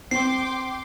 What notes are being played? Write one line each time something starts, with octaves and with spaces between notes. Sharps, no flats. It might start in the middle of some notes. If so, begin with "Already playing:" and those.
C4 G5 C6 D6 C7